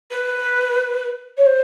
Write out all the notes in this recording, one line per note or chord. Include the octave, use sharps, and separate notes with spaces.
B4
C#5
C5